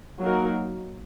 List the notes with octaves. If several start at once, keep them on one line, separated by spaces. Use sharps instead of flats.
F#3 A#3 D#4 F#4 A#4